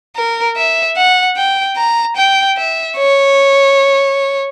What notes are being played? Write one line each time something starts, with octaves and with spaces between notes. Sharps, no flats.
A#4
E5
F#5
G5
A#5
G5
E5
C#5